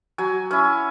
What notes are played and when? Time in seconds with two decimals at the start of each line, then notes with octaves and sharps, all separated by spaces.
0.18 F#3 G#5
0.51 C#4 E4 G#5